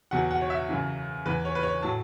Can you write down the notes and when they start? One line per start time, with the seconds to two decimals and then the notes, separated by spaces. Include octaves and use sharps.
0.11 E2 B2 F#3 F#5
0.31 F#5
0.41 C#5
0.50 E5
0.69 F#2 C#3 E3
1.25 E2 E3 B4
1.45 C#5
1.55 B4
1.63 C#5
1.83 A2 F#3 A5